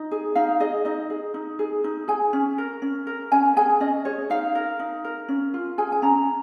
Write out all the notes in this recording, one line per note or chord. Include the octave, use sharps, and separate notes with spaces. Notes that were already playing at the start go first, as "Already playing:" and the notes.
Already playing: D#4 D#5
G#4
D#4 F5
G#4 D#5
D#4 D#5
G#4
D#4
G#4
D#4
G#4 G#5
C#4
A#4
C#4
A#4
C#4 G#5
G#4 G#5
C#4 D#5
G#4 C#5
D#4 F5
A#4
D#4
A#4
C#4
F4
G#4 G#5
G#5
C#4 A#5